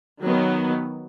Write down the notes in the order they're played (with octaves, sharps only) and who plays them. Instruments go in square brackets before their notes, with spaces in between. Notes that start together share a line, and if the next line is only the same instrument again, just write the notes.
[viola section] D#3 F#3 B3